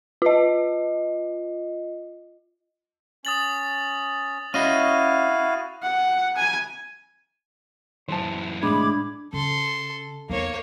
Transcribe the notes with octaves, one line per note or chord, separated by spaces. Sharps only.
F4 D#5
C#4 D#6 A6 F#7
C#4 E4 F#4 D#5 F5 C#6 D#7
F#5
G#5
F#2 E3 C5 A5
C2 A2 G#3 D4 B5 D6 G#6
C#3 A4 C6
E2 A#3 D#4 C#5